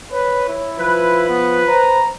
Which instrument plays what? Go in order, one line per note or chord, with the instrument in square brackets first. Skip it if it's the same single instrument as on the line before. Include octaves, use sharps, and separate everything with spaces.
[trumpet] B4 [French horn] C#5
[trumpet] E4
[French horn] F3 [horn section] B4
[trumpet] B3
[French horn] C5 [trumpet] A#5